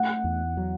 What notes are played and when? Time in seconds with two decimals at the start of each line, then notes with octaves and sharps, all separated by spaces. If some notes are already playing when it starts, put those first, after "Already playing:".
Already playing: A3 F#5
0.24 E2
0.57 F#3